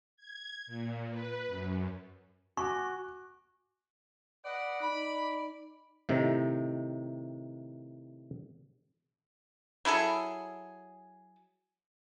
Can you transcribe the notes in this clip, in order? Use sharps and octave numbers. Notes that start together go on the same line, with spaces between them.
G#6
A#2
B4
F#2
F#4 G#5 C#6 D6
B4 D5 D#5 F#5
D#4 B5
A2 C3 D#3
F#3 E4 G#4 A4